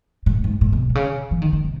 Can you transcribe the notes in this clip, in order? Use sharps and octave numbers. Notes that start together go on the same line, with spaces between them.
A2
G#2
A2
B2
C3
C#3
E3
D#3
D3
C3